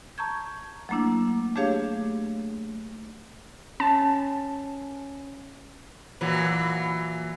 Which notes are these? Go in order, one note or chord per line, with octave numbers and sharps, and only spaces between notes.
A5 A#5 C#6 G6 G#6
F#3 A3 A#3 D4 E4
A3 D4 G4 G#4 C#5 F5
C#4 A5
A#2 E3 F#3